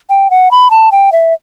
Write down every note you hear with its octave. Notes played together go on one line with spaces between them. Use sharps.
G5
F#5
B5
A5
G5
E5